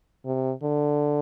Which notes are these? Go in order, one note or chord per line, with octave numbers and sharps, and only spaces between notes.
C3
D3